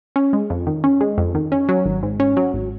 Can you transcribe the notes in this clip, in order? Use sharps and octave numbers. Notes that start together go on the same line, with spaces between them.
C#4
G#3
F2
D#3
C#4
G#3
F2
D#3
C#4
F#3
G#1
G#2
C#4
F#3
G#1